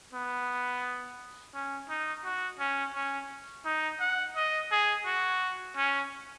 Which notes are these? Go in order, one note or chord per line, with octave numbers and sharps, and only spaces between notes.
B3
C#4
D#4
F#4
C#4
C#4
D#4
F#5
D#5
G#4
F#4
C#4